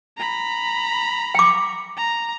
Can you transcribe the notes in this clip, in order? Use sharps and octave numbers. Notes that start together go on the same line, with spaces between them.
A#5 B5
G5 D6
A#5